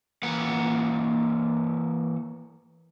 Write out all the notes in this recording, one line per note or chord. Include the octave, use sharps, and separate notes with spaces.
E3 A#3 F#5